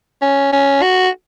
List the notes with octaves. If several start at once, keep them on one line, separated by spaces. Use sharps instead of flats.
C#4
C#4
F#4